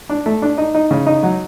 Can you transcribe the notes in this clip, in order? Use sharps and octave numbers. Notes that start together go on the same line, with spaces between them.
D4
A3
D4
D#4
D#4
C#3
D#4
F#3